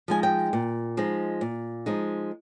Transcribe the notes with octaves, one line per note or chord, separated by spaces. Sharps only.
F3 G#3 D#4 G#5
G5
A#2
F3 G#3 D#4
A#2
F3 G#3 D#4